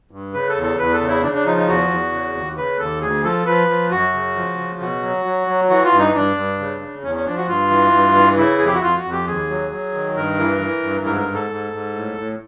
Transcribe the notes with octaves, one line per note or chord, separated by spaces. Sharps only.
G2
C#3 B4
A4
E2
A4
E2 B4
A4
C#3
E4
C#3 D4
D4
F3 D#4
D#4
E2 F#4
E2
C#3
D#2
C#3 B4
D#2 A4
D2 G#4
F3 A4
F3 B4
F3
F#2 F#4
C#3
F3
C#3
B2 F#4
F#3
F#3
F#3
E3 F#4
F4
G2
D#4
G2 D4
G2
C#3
C#3
E2 C#4
C#4
F3 D4
F#4
G2 F4
E3
G2
E3
C#3 E4
F2 G#4
G4
F#4
F2 F4
F#4
F2
G4
D#2 G#4
F#3
F#3
D#3
G2 A#4
E3
E3
G2
G#2 A#4
A#4
G#2
A4
G#2
G#2
A2
A2